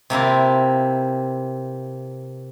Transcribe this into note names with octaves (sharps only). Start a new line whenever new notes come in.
C3 A#3 E4 F4